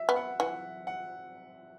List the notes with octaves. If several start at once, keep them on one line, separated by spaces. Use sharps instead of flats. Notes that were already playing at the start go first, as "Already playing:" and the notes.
Already playing: E5
B3
F#5
E3 F#5
F#5